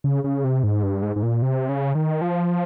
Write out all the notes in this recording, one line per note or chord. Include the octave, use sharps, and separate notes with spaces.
C#3
C#3
C3
G#2
G2
G#2
G#2
A#2
C3
C#3
D#3
F3